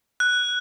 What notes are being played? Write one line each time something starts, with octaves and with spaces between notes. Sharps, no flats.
F#6